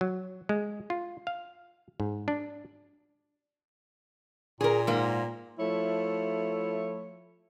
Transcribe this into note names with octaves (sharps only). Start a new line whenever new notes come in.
F#3
G#3
F4
F5
G#2
D4
A#2 G#4 A#4
G#2 A#3
F3 A3 E4 C#5